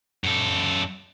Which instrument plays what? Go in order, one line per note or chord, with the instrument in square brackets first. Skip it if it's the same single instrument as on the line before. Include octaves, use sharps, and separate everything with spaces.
[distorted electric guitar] F#2 A4